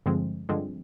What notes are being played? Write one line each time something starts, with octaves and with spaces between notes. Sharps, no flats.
G2 D3 F3 G#3 C4
G2 D3 F3 G#3 C4